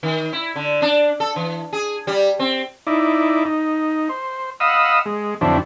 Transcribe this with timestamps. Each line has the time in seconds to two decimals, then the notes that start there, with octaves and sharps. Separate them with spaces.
0.03 D#3
0.33 E4
0.56 D3
0.82 D4
1.20 A4
1.36 E3
1.73 G#4
2.07 G3
2.39 C4
2.87 D#4 E4 D5
3.45 D#4
4.09 C5
4.60 D#5 F5 F#5 B5 D#6 E6
5.06 G#3
5.41 F2 D3 F#3 C4 D4 E4